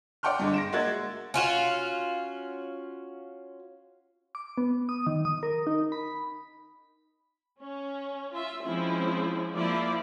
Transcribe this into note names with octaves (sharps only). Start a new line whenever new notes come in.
D5 F#5 G5 C6 F6
G2 D3 G#3
A#6 D7 E7
G#3 A#3 F#4 E5 G#6 A6
C#4 F4 F#4
D6
B3
D#6
D#3
D#6
A#4
D#4
B5
C#4
F4 E5
F3 G#3 C4 C#4 E4
F3 A#3 E4 D5